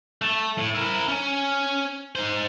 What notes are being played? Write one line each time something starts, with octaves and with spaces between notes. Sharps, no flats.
A3
A2
E4 A#4
C#4
D#4 C5